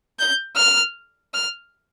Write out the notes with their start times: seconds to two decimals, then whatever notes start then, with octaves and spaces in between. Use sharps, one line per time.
0.19 G6
0.57 F6
1.34 F6